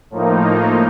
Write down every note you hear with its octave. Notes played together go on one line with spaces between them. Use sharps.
A2 F3 A#3 D#4